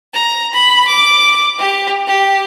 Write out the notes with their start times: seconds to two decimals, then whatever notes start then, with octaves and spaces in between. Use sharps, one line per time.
0.12 A#5
0.52 B5
0.87 D6
1.58 G4
2.05 G4